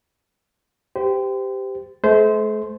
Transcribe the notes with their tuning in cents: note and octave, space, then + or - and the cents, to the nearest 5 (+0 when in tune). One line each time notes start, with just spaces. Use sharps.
G4 +0 C5 -30
A3 -45 C5 -15